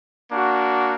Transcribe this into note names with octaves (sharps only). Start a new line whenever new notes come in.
A#3 D4 F#4